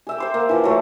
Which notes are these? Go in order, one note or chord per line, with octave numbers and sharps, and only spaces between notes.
G#4 E5 G5
C5 C6 D6
A#3
E3 F3
F#3 A3 D6